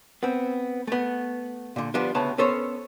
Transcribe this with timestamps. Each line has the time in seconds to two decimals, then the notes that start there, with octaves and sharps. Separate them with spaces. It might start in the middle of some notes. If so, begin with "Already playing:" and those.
0.23 B3 C4
0.88 A3 B3
1.76 A#2 D3
1.94 F3 G3 B3 D4
2.14 D2 C#3 B3 C#4 A5 B5
2.38 B3 C#4 A4 C5 C#5